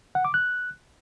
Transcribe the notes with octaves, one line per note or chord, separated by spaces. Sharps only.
F#5
D6
F#6